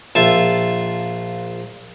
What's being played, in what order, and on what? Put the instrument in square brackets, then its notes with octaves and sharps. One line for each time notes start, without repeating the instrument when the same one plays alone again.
[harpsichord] A#1 F4 E5 A5